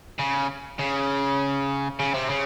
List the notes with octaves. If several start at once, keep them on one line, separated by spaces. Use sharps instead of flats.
C#3
C#3
C#3
C3
C#3